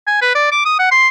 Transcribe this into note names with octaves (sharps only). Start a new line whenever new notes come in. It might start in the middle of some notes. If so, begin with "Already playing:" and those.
G#5
B4
D5
D6
D#6
F#5
C6